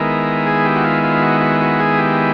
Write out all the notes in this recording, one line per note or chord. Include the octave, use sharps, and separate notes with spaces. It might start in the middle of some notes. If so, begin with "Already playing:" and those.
Already playing: D#3 G#3 B3 E4 A#4
G#4
G4
F#4
F4
F4
F#4
F#4
F#4
G#4
G4